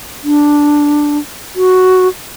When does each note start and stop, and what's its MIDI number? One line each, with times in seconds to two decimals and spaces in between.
0.24 1.18 62
1.56 2.08 66